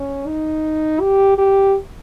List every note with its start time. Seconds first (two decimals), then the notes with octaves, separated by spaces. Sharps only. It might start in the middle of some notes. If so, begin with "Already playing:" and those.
Already playing: C#4
0.27 D#4
1.01 G4
1.38 G4